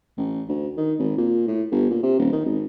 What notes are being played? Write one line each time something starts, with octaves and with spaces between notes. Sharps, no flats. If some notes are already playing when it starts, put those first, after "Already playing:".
A1
D2
D#3
G#1
A#2
A2
G1
A#2
C3
D#1
D#3
G#1